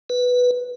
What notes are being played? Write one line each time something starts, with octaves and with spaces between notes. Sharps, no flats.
B4